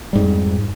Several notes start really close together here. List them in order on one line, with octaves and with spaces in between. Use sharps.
G3 G#2 F2